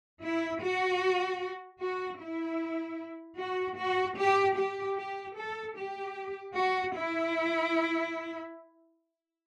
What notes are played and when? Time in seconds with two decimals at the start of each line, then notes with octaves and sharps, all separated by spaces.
0.22 E4
0.61 F#4
1.81 F#4
2.21 E4
3.40 F#4
3.79 F#4
4.18 G4
4.58 G4
4.98 G4
5.38 A4
5.78 G4
6.56 F#4
6.96 E4